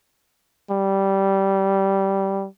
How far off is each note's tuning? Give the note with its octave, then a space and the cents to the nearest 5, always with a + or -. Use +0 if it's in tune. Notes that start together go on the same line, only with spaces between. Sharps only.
G3 -10